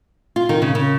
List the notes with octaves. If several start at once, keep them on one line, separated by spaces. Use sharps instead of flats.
F4
D#3
C#3
C#3